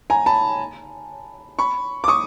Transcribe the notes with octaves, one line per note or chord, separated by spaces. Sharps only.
G#5 A#5
A5 B5
B5 C#6
D6
C#6 D#6